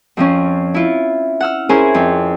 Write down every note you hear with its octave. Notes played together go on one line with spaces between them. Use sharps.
F2 F3 C#4
E4 F4
F#5 E6 F6
C#4 E4 G#4 A#4 C5 G#5
F2